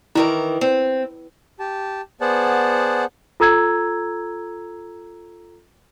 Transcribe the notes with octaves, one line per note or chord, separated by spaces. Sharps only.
D#3 E3 E4 A#4
C4
G4 A5
B3 G#4 C5 D5 F#5 A5
F4 A4 A#5 E6 G#6